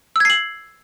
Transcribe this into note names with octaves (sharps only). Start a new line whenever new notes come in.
E6 G#6 C7 F#7